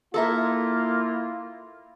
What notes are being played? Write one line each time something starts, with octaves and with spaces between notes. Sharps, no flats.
A#3 E4 F4 A4 A#4 E5